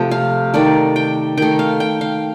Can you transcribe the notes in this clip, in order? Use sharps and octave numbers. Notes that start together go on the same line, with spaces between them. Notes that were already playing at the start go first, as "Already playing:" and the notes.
Already playing: C3 F3 A3 A5
F5
D#3 A3 D5
G5
D#3 A3 G5
F5
G5
F5